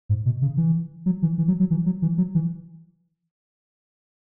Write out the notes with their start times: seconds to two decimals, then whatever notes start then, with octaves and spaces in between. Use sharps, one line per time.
0.09 G#2
0.26 B2
0.42 C#3
0.57 E3
1.06 F#3
1.22 E3
1.38 E3
1.48 F#3
1.60 F#3
1.70 E3
1.86 F#3
2.02 E3
2.18 F#3
2.35 E3